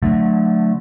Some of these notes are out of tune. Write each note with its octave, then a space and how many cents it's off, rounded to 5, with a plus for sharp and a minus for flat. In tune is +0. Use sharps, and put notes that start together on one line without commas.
D3 +10 F#3 -20 A3 +0